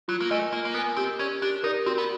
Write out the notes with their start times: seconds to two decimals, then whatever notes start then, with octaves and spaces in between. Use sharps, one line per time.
0.08 F#3 F4
0.20 A#3
0.31 A3 A#4 D#5 G#5
0.53 A#3 F4
0.65 A#3
0.74 B3 A#4 D#5 G#5
0.97 C4 G4
1.19 C#4 A#4 D5
1.42 D4 G4
1.63 D#4 A#4
1.66 D5
1.86 C4 F#4
1.98 B3